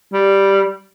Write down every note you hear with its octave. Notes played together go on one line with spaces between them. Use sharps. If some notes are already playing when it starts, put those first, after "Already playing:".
G3